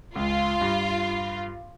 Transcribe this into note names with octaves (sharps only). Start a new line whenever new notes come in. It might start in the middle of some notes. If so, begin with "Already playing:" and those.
C#2 F4
G2